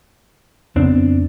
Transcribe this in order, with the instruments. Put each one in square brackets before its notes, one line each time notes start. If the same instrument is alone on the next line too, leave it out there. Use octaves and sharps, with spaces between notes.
[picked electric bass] F2 C#3 B3 [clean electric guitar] C4 D4